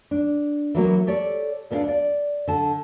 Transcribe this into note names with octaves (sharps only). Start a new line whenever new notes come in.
D4
E3 F#3 A#3 B3
G4 A4 C#5 D5
D2 B3 D4 E5 F5
D5
D3 A5